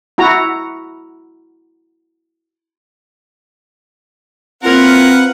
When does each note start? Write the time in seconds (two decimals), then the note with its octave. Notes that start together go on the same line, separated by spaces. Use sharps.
0.18 E4 F#4 A#5
4.63 A#3 C4 E4 F4 A#4 B4 F5 F#5